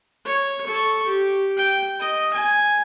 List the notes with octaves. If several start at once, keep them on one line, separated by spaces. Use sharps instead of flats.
C#5
A4 C#6
G4
G5
D#5
G#5